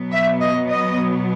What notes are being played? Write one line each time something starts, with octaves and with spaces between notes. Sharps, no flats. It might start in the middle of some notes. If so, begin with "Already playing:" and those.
Already playing: B2 F#3 B3
E5
D#5
D#5